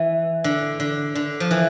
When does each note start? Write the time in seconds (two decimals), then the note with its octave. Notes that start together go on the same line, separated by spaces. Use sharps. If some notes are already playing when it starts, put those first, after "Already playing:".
Already playing: E3
0.44 D3
0.80 D3
1.15 D3
1.40 F3
1.51 E3